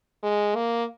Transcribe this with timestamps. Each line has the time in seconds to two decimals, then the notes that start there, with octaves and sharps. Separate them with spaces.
0.23 G#3
0.55 A#3